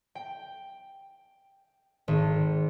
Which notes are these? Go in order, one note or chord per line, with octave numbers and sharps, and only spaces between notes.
G5
G#1